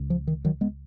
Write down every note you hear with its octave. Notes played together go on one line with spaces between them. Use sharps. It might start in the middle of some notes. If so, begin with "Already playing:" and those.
Already playing: C#2 C#3
F3
D#3
D#3 F#3
G#3 B3